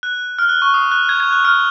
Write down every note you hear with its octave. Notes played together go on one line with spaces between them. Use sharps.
F#6
F6
F#6
C#6
D#6
F#6
G#6
G#6
F#6
F6